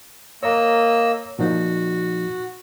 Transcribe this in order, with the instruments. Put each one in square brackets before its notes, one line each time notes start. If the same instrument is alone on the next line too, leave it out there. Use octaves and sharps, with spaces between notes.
[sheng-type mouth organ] A#3 D#5 E6 [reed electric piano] C#5 A#5
[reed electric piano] A#2 F3 D#4 [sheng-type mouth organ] F#4